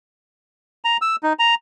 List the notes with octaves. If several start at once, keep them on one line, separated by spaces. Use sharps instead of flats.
A#5
E6
D#4
A#5